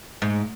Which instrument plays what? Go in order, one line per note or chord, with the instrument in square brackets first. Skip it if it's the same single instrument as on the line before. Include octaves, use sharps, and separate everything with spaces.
[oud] G#2